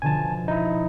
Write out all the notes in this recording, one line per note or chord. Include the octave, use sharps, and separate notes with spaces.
B2 D3 F3 G#5 A5
D#4 E4